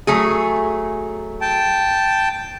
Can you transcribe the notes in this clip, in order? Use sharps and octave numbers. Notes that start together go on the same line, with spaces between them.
F#3 A3 G#4
G5 A5